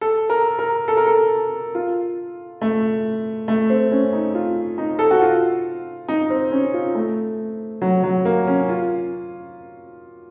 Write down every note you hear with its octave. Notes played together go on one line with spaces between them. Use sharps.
A4
A#4
A#4
A4
A#4
A4
F4
A3
A3
C4
C#4
D#4
F4
D#4
A4
F#4
F4
D#4
C4
C#4
F4
A3
F#3
F#3
A#3
C#4
F4